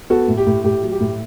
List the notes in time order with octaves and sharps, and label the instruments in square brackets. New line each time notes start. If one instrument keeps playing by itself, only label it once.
[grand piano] B3 F#4 A4
A2
G4
A2
A2 G4
F#3
G4
A2